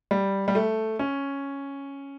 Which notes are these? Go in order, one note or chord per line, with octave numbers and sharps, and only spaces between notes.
G3
G3
A3
C#4